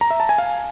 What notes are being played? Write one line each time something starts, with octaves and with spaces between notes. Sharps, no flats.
A#5
E5
A5
G#5
F5